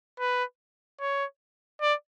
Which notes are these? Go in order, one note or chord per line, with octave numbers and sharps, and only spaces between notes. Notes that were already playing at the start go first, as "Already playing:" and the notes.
B4
C#5
D5